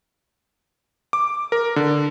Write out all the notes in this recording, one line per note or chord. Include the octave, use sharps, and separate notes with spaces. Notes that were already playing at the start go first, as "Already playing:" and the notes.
D6
A#4
D3